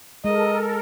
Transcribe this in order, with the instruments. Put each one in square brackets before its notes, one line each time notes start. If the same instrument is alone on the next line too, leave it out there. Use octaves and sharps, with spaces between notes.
[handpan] G#3 [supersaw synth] A4 A#4 [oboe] D#5